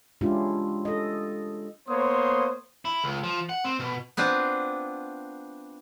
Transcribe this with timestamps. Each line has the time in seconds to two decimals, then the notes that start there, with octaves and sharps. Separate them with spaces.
0.21 G#3 C#4 D4 E4 F4 G4
0.85 A4 D#5
1.88 A#3 B3 C5 C#5 C6 D#6
2.85 E4
3.04 C#2
3.23 F3
3.49 F#5
3.65 C4
3.80 B2
4.17 B3 C4 D4 F4